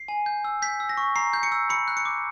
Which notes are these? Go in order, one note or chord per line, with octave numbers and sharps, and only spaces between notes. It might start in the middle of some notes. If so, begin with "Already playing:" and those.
Already playing: C7
G#5
G6
E6
G6 B6
E6
A#6
C#6
A#5 C7
G6
C#7
E6
B5 C#7
F#6
C#7
D6